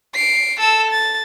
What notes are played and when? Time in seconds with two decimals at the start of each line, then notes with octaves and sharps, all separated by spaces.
0.15 C7 D7
0.60 A4 E6
0.91 A6